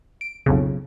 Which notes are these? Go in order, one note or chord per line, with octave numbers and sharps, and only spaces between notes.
D7
B1 F2 C#3